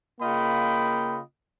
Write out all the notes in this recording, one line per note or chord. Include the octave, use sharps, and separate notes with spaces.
C#3 A#3 F4 D#5 G5 B5